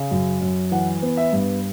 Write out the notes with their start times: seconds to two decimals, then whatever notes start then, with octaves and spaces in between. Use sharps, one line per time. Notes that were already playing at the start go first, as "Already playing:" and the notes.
Already playing: C#3
0.11 F#2
0.42 F#2
0.71 E3 F#5
1.02 B3
1.17 E5
1.33 G2